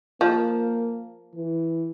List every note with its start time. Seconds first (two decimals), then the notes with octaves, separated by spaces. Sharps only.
0.21 F3 A#3
1.35 E3